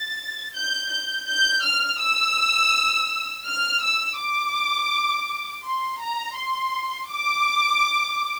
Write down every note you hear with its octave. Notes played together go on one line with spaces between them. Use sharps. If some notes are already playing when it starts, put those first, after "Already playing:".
Already playing: A6
G6
G6
G6
F6
E6
F6
E6
D6
C6
A#5
C6
D6